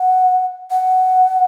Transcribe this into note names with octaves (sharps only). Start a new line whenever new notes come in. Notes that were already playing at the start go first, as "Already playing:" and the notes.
Already playing: F#5
F#5